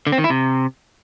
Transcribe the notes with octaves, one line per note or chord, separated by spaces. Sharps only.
D3
C4
D#3
E4
C3